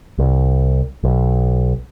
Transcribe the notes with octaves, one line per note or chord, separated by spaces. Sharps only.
C2
B1